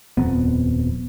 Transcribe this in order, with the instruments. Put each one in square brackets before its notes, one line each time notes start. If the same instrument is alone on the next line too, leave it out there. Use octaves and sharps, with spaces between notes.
[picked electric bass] D#1 F2 B3